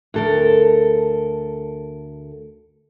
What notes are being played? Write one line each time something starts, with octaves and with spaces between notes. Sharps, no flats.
D2 A4 A#4